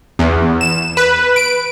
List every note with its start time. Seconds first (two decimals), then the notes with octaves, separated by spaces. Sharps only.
0.19 E2
0.61 E7
0.97 B4
1.36 D7